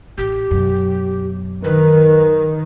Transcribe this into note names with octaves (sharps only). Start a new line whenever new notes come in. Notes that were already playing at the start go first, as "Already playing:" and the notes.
A1 G4
F#2 B2
D#3 A#4 B4